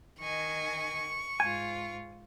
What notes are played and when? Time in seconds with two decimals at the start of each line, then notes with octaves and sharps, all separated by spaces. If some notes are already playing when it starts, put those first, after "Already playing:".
0.20 D#3 D#5 G#5 C#6
1.40 G#2 F4 G#5